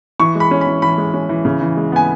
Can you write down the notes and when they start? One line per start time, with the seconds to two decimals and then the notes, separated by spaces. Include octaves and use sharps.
0.20 E3 C#6
0.35 G#3
0.40 B5
0.51 C#4
0.61 B5
0.66 E3
0.82 E3 B5
0.98 G#3
1.14 C#4
1.29 E3
1.45 C#3
1.61 E3
1.77 G#3
1.92 B3 G#5